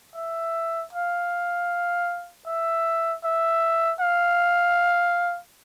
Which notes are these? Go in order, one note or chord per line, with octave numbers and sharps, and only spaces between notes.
E5
F5
E5
E5
F5